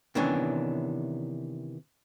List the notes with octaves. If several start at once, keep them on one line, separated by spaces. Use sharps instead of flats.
C3 D#3 E3 B3 C#4 D4